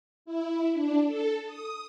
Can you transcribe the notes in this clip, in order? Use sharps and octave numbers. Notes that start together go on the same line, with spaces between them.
E4
D4
A4
D#6